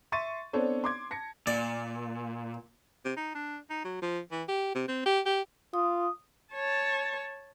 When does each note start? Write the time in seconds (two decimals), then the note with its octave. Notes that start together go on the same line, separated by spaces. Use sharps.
0.12 E5 C6 C#6 A6 D#7
0.53 B3 C4 D4 A4 C5 C#5
0.84 C6 D6 G#6
1.11 A5 A#6 C#7
1.47 A#2 D5
3.05 C3
3.17 D#4
3.35 D4
3.70 D#4
3.84 F#3
4.02 F3
4.31 E3
4.48 G4
4.75 C3
4.88 C4
5.06 G4
5.26 G4
5.74 F4 D#6
6.53 C#5 A5